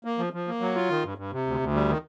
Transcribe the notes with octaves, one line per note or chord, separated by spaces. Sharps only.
A#3
F3
F3
A#3
F#3
F4
D#3
G2
G2
C3
D2
D2
G3
D#3